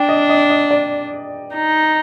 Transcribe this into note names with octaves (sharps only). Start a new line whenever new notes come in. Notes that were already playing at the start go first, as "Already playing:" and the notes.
Already playing: D4 G5
D#5
D#5
D#5
D5
D#4